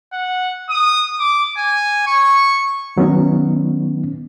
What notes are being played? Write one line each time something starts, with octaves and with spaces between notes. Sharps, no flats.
F#5
D#6
D6
G#5
C#6
D#3 F#3 B3 C#4 D#4